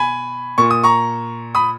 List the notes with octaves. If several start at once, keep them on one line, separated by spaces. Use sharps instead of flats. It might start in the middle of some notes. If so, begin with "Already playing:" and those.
Already playing: B2 G#5 B5
A#2 C#6
D#6
A#5 C#6
B5 D#6